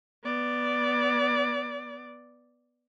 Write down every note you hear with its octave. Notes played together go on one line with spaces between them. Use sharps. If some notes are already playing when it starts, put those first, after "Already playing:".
B3 D5